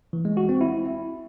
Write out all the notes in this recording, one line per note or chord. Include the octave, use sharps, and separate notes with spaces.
E3
G#3
F#4
C4
E4